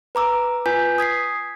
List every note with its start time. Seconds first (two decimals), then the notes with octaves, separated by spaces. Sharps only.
0.15 B4 A#5 D6 E6
0.66 F4 B4 G#5 G6 B6
0.98 D#6 G#6 B6 C7